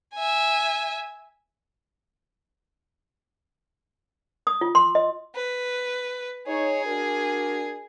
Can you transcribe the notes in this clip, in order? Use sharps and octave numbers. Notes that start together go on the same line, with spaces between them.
E5 G#5
D#6
F4
C6
D#5
B4
D#4 G#4 C#5
D4 F#4 A#4